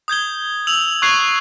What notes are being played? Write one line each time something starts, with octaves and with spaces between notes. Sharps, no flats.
D#6 G6 G#6 G7
E6 F7 F#7
C#6 F#6 G#6 C7 F7